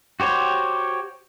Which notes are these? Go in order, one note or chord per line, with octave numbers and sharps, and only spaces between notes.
F#4 G4 C5 C#5